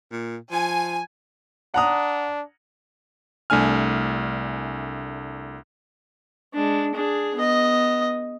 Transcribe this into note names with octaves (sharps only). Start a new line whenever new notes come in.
A#2
F3 G#5
D4 F#5 A#5 D#6
C2 A3 D4 G#5 F6
G#3 D4
D4 G#4
B3 D#5